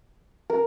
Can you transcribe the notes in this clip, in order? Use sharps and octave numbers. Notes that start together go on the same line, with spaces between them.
A#4